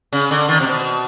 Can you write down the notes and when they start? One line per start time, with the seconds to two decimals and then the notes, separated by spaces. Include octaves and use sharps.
0.12 C#3
0.31 D3
0.49 D#3
0.60 C3
0.66 B2